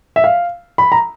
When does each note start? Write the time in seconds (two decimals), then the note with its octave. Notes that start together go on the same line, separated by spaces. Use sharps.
0.16 E5
0.24 F5
0.78 B5
0.92 A#5